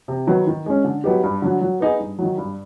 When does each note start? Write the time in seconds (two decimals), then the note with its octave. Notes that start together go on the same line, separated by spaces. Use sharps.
0.08 C3
0.27 D#3 F#3 B3
0.47 D#3
0.66 G#3 C#4
0.84 D3
1.04 F#3 B3 D#4 G4
1.23 G2
1.42 D3 F#3
1.61 F#3
1.80 B3 D#4 G#4
2.00 G2
2.19 D#3 F#3
2.38 G2